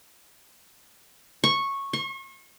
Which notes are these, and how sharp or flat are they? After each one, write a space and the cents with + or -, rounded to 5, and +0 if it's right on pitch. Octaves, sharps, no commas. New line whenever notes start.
C#6 -10
C#6 -40